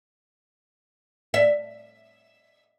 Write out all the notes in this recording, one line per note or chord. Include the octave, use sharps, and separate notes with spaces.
E5